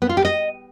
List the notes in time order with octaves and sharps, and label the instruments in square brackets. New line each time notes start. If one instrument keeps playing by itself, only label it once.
[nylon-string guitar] B3
F4
G4
D#5